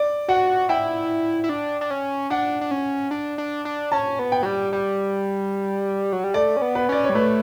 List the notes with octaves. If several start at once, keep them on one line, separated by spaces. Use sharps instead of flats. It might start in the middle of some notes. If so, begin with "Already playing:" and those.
Already playing: D5
F#4 F#5
E4 G5
E4
D4
D4
C#4
D4 F#5
D4
C#4
D4
D4
D4
C#4 A5
B3
G5
F#3
G3
G3
F#3
G3
A3 D5
C#4
B3
B4
C#4 D5
C#5
G3
A3 B4